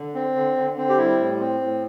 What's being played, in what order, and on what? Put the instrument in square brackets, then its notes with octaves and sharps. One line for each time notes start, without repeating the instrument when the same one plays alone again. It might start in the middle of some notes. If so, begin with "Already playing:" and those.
Already playing: [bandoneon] D3
C4
D3
D3
C4
G4
G3 E4
A2
C4
A2